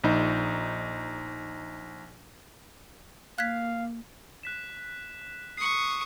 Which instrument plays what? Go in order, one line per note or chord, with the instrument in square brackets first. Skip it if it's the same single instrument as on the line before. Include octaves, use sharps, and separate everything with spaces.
[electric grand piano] A#1 D#4
[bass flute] A#3 [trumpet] F5 [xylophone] F#6 G#6 B6
[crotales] F#6 B6 E7
[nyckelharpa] C#6 D#6 [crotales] C7 C#7